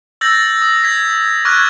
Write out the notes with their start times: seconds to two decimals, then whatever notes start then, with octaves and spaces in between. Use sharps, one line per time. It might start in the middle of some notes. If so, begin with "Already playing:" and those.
0.21 E6 G6 A6 A#6
0.62 D#6
0.84 G#6 B6
1.45 C#6 D6 F6 F#6 G#6 A6